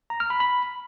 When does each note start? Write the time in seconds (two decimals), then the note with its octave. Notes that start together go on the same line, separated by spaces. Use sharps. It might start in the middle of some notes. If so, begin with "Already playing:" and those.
0.10 A#5
0.20 F6
0.30 B5
0.40 B5